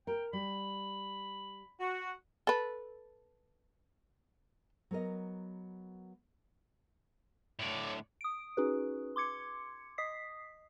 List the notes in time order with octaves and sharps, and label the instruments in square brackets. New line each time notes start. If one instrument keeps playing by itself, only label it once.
[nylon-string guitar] A#4 [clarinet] G5
[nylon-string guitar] G3 [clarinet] B5
[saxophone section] F#4
[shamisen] A4 B4
[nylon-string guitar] F#3 B3 A#4 D#5
[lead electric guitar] A2 D3 [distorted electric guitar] C#5 D5
[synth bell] D#6 D7
C#4 D#4 F#4 G#4 B4
C6 D6 G#6 C#7
D#5 D#6 B6 C7